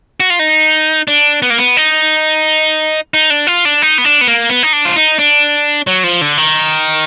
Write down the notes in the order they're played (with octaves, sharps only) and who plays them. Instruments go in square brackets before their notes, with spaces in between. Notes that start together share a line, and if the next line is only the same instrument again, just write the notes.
[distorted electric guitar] F#4
F4
D#4
D4
B3
A#3
B3
D#4
D#4
D4
F4
D4
D#4
B3
D4
B3
A#3
B3
D#4
D4
F4
D#4
D4
F#3
F3
D3
D#3